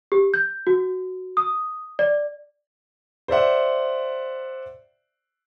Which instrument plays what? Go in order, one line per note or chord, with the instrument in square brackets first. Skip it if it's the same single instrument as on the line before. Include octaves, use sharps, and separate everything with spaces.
[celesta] G4
G6
F#4
D#6
D5
[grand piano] C5 D5 E5 F#5